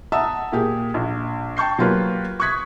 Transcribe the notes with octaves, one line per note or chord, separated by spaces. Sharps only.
E5 F#5 A5 A#5 D#6 E6
A#2 G4 G#4
A#1
G5 A5 C#6 G6 C7
F#3 A#3 F4 G4 B4
C#6 D#6 F#6 G#6 B6